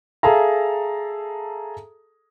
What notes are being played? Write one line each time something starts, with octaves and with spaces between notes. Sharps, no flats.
G#4 A4 E5 F5 A5 A#5